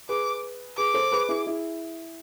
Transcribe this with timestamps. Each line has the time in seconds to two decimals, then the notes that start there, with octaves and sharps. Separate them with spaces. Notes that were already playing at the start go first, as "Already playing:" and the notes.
0.09 G#4 B4 D6
0.77 G#4 B4 D6
0.94 A4 C5
1.12 G#4 B4
1.29 E4 G#4
1.46 E4 G#4